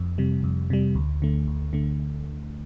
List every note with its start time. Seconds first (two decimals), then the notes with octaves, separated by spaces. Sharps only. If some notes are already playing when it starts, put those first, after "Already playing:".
Already playing: F2
0.18 C3 G3
0.44 F2
0.70 C3 G3
0.95 D2
1.22 D3 A3
1.47 D2
1.73 D3 A3